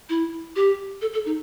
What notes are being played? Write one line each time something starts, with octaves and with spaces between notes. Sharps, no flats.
E4
G4
A4
A4
D#4